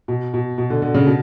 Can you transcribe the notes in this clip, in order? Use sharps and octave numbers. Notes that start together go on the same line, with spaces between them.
B2
B2
B2
D3
D3
C#3
B2